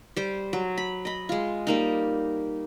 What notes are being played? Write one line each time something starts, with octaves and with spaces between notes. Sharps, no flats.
G3 C5
F#3
B5
D#5 B5
G#3 F4
G3 A#3 D#4